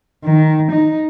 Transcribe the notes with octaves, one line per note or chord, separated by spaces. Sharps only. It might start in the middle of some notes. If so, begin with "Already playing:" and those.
D#3
D#4